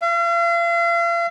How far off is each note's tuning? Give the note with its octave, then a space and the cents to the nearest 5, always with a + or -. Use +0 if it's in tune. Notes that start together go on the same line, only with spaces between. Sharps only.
F5 -40